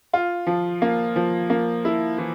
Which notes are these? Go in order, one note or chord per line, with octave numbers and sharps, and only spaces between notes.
F4
F3
A#3
F3
A#3
E4
E3